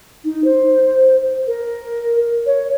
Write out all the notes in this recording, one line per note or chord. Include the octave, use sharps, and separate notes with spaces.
D#4
C5
A#4
C#5